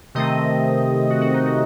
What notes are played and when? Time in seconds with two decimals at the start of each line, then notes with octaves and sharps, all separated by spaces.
0.15 C3 D#3 A3 C4 D#5
1.10 F#4
1.21 F#4
1.34 D#4
1.46 F#4